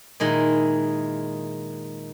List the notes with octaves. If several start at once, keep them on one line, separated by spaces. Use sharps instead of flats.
A#2 D#3 G#3 E4